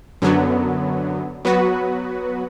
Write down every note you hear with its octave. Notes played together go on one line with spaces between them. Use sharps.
F#2 D3 F#3 B3
F#3 B3 F#4 B4